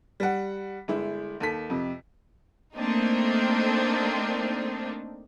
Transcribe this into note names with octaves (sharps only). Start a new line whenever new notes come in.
G3 F#5
G1 G#3 E4
D#2 A4 B6
F2 C3
A3 A#3 C4 D4 D#4